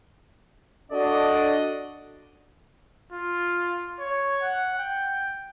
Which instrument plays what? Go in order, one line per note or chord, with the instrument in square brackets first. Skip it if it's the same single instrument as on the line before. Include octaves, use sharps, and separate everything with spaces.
[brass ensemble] D4 F#4 A4 D5 D#5
[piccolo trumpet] F4
C#5
F#5
G5